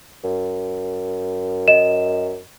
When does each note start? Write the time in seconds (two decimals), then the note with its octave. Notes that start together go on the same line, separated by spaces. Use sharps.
0.24 F#2
1.68 D#5 E7